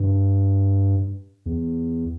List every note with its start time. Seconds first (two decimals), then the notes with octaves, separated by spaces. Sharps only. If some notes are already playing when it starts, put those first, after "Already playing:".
Already playing: G2
1.46 E2